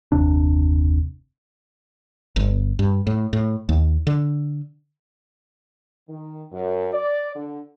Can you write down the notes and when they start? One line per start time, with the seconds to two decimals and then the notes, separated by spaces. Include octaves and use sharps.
0.12 F#1 D#2 C3 D4
2.36 G1
2.79 G2
3.07 A2
3.33 A2
3.69 D#2
4.07 D3
6.09 D#3
6.51 F#2
6.93 D5
7.35 D3